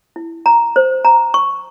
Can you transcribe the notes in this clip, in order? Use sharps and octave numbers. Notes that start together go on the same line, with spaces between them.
E4
A#5
C5
A#5
C#6